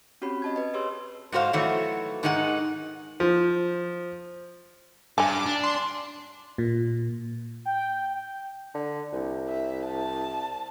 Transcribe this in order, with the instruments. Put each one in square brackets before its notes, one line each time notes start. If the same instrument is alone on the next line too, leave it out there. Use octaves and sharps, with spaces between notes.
[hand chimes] C4 C#4 F#4 G4 C#5 B5
D#5 A5 G#6
B4 D#5
G4 G#4 C#5 C6 E6
[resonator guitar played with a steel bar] G#2 D#4 F#4 C5 F5
D#3 E3 F#3 A3 F#4 C#5
G#2 D#3 G#3 D#4 A4 F#5
[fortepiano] F3
[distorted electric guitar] G2 [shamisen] G#5 A5 [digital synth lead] D6
[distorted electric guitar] D4
[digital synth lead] C6
[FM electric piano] A#2
[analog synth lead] G5
[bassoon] D3
C2
[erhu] E5
A5